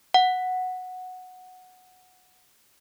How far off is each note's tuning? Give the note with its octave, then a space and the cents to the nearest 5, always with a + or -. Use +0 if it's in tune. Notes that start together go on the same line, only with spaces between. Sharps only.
F#5 -5